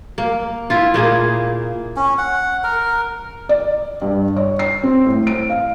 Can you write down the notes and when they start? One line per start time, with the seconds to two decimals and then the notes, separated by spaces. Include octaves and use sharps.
0.18 A#3
0.70 E4 F4
0.94 A#2 A#3 G#4
1.96 C#4
2.18 F#5
2.64 A#4
3.49 D5
4.02 G2
4.36 C#5
4.59 C7
4.83 C4
5.06 A2
5.27 D7
5.50 F5